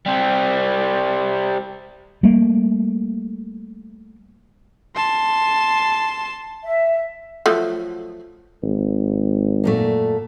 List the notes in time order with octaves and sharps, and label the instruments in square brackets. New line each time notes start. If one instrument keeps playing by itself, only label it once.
[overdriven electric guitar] G3 C4
[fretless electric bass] G3 A3 A#3
[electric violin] A5 C6
[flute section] E5
[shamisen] F3 F#3 A3
[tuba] G#1
[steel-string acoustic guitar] F#2 A#2 A3